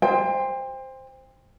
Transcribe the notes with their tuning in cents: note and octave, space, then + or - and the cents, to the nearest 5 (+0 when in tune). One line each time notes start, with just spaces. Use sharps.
C5 +0 G5 +35